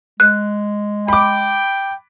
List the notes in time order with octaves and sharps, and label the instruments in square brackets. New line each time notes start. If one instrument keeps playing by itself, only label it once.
[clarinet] G#3 [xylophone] F#6
[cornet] G5 [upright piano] B5 D6